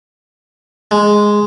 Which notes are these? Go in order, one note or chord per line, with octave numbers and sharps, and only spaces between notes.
G#3